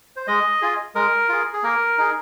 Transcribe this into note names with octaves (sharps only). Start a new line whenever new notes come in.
C5
G#3 D#5
F4 G#4
G#3 A#4
F4 G#4
G#4
A#3 A#4
D#4 G#4